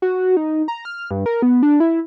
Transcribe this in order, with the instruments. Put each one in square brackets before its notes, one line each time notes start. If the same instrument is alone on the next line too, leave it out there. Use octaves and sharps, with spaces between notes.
[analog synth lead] F#4
D#4
A#5
F6
G2
A#4
B3
D4
E4